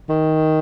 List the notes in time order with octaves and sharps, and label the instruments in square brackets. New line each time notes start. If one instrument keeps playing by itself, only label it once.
[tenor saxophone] D#3